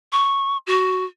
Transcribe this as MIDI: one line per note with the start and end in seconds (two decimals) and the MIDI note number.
0.12 0.57 85
0.67 1.05 66